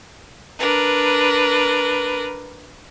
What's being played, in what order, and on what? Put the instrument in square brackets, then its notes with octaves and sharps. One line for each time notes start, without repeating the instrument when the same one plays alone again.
[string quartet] D4 A#4 B4